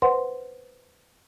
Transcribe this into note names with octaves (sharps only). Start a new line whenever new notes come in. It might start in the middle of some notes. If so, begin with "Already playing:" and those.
B4 C5 F#5 C6